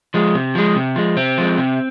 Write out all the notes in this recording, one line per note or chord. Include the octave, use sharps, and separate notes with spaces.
F3 G#3
C3
F3 G#3
C3
F3 G#3
C3 C4
F3 G#3
C3